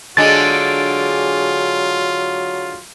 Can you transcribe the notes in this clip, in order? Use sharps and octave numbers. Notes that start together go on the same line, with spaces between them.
D3 F#3 G#3 D4 F4 A6